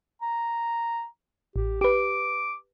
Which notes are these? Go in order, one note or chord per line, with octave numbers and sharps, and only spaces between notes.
A#5
A1 G4
G4 B4 D6